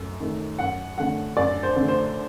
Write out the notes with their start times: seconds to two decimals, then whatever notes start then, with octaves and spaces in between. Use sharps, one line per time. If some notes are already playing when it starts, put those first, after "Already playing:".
Already playing: F#2 A3
0.20 D#3 A3
0.59 F#2 F#5
0.98 D3 A3 F#5
1.37 F#2 D5
1.63 C5
1.76 D3 A3
1.88 C5